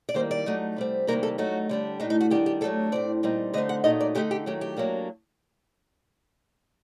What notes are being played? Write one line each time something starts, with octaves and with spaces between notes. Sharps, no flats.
D5
D#3 G3 A#3 C5
D5
F#3 A3 D#4
C3 G3 C4
C3 D#3 G3 A#3 A#4
A4
F#3 A3 D#4 F#4
D3 G3 D4
A2 A3 D4 D#4
D#4
F#4
D#3 G3 D4 G4
G4
F#3 A3 D4 A4
A2 F#3 C4 D5
A#2 G3 C4 D#4
D3 A3 C4 D#4 D#5
F#5
A#2 F#3 A3 D#4 D#5
D5
D3 A3 D#4 G4
G4
D#3 F#3 A3 G4
G4
F#3 A#3 D4